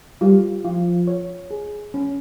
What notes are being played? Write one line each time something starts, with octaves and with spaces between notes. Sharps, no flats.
G3 F4
F3 F4
C#5
G#4
C#4